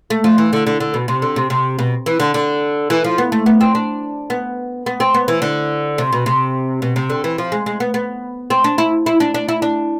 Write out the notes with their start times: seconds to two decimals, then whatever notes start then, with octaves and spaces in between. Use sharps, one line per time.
0.10 A3
0.24 F3
0.38 E3
0.53 D3
0.67 D3
0.80 D3
0.94 B2
1.08 C3
1.22 D3
1.36 C3
1.50 C3
1.79 B2
2.06 E3
2.20 D3
2.34 D3
2.90 E3
3.04 F3
3.18 B3
3.32 A3
3.46 B3
3.61 C4
3.75 D4
4.30 B3
4.86 B3
5.00 C4
5.14 B3
5.28 E3
5.42 D3
5.98 C3
6.13 B2
6.26 C3
6.82 B2
6.96 C3
7.10 D3
7.24 E3
7.38 F3
7.52 G#3
7.66 G#3
7.80 B3
7.94 B3
8.50 C4
8.64 D4
8.78 E4
9.06 E4
9.20 D4
9.34 D4
9.48 E4
9.62 D4